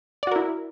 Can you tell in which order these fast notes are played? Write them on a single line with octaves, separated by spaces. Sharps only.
D5 F#4 A#4 E4